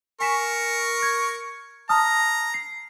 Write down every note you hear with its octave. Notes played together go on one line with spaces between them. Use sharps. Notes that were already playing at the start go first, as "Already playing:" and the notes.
A#4 G#5 C#6 B6 E7
G#6
A5 A#5 D#6 F6
C7